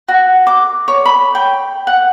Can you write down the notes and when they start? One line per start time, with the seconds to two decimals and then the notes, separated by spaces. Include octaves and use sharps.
0.08 F#4
0.47 D6
0.88 C#5
1.06 B5
1.35 G5
1.87 F#5